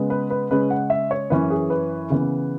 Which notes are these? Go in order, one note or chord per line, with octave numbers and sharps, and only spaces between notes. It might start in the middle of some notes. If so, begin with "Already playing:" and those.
Already playing: C#3 G#3 B3
B4
B4
C#3 G#3 C#4 B4
F#5
E5
C#5
F#2 E3 C#4 B4
G#4
B4
C#3 E3 B3